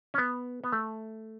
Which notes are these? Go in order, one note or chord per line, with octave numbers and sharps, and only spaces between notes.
C#4
B3
B3
A3